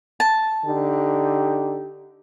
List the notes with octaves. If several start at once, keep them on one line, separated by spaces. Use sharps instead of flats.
A5
D3 D#4 G4